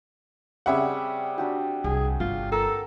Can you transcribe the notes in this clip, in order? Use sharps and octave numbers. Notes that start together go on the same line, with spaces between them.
C#3 G3 C4 C#4 E5 F#5
D4 F#4 G4
C2 G#4
G1 F4
A4 A#4